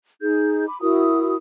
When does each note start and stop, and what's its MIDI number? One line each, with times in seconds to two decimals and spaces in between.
0.21 0.67 63
0.21 0.67 68
0.21 0.67 91
0.67 0.78 83
0.67 0.78 86
0.81 1.35 64
0.81 1.35 66
0.81 1.35 70
0.81 1.35 87